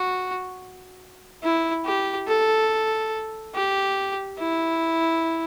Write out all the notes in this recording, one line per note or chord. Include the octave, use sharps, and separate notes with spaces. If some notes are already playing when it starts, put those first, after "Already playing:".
Already playing: F#4
E4
G4
A4
G4
E4